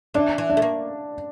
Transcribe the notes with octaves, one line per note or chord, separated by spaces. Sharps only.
E3 D4
E3
D4
A3
A#3